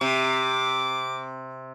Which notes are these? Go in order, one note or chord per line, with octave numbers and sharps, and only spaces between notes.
C3 D6